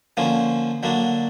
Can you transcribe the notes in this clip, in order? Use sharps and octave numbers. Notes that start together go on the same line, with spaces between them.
D3 F3 A#3 C#4
D3 F#3 A#3 D4